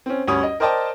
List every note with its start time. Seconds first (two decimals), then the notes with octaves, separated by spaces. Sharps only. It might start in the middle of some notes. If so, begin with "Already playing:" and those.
0.06 C4 C#4
0.28 D2 G2 C#4 C#5 D#6
0.43 D#5
0.60 A#4 C5 D5 D#5 G5 A5